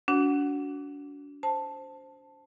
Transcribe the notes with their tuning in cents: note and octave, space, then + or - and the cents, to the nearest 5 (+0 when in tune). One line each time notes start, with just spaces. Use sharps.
D4 -40 F#4 +5 F#5 +0
C5 +0 A5 +0